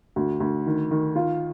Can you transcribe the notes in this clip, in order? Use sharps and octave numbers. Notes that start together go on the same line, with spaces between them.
D2
D2
D#3
D#3
F4